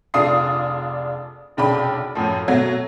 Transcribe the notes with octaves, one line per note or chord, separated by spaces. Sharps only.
F1 D4 F4 G#4 D#6 C7
F1 B1 C#3 D4 G5 B5
F#2 A2 F3
B2 F#3 A3